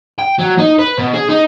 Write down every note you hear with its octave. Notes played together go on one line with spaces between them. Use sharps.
G5
F#3
D#4
B4
B2
G#4
D#4